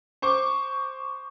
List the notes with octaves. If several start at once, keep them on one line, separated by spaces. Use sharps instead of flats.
C5 C#6 D6